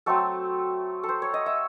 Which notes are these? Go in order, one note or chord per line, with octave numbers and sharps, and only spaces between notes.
F#3 A3 C4 A4
A4
C5
C#5
D#5
E5